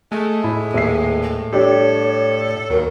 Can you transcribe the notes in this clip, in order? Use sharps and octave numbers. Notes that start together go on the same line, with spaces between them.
G#3 A3
A2 E4
D#1 E5 C7
G3 D4 G4 A4 C#5
D#2 F#3 A#4